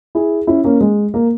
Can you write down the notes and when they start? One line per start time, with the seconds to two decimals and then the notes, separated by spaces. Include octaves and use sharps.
0.15 E4 G#4
0.47 C#4 E4
0.64 A#3 C#4
0.81 G#3
1.14 A#3